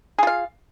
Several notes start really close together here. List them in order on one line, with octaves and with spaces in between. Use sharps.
G#4 F4 F5